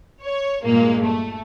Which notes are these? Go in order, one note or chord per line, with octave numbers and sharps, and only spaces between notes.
C#5
G2 A#2 G#3 A#3
A3